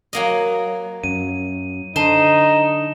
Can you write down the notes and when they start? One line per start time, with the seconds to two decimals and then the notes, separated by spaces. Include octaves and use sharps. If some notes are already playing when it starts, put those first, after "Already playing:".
0.13 F#3 A#3 D#5
1.04 F#2 D#7
1.96 D3 D#4 C5 A5 E7 G7